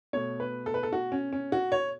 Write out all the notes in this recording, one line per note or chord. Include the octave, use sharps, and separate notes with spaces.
B2 A3 C#5
B4
A4
B4
A4
F#4
C#4
C#4
F#4
C#5